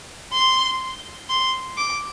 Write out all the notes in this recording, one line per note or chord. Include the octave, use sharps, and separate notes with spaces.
C6
C6
D6